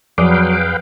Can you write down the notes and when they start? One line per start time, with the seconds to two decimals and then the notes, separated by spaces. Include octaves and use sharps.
0.18 F2 F3 F#3 G#4 B4 F5 G5 D#6